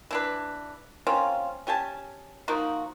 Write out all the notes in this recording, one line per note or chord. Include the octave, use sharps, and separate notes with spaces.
E3 D4 B4
A#3 C4 C#4 F4
C#4 G4 G#5 A5
F3 A#3 D#4 F#4